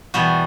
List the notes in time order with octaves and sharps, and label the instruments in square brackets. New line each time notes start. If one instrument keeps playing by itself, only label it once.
[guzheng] E2 B2 G3 F#4